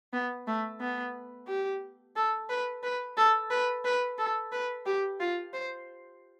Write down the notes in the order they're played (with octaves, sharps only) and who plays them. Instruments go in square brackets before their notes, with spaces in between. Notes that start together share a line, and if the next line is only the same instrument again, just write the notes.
[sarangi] B3
A3
B3
G4
A4
B4
B4
A4
B4
B4
A4
B4
G4
F4
C5